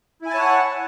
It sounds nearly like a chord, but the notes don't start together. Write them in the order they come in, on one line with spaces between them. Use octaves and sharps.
E4 G#5 A5 C#5 F#5